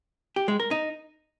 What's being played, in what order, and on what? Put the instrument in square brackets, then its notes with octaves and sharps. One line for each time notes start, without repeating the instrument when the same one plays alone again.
[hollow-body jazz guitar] G4
G#3
A#4
D#4